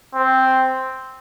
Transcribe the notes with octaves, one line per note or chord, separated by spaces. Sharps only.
C4